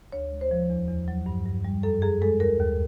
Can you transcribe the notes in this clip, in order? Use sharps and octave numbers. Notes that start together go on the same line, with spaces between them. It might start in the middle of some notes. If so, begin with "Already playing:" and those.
D2 C#5
G#3
C5
F3
E2
E2
F#3
G2
G2
G3
F#2 A4
F#2 G#4
G#3 A4
D#2 A#4
D#2